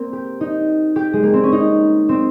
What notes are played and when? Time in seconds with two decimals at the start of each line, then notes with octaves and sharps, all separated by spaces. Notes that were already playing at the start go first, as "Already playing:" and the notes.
Already playing: A#3 C4
0.13 G4
0.41 D#4
0.96 G4
1.13 G#3
1.23 A#3
1.33 C4
1.43 C#4
1.52 D#4
2.09 C4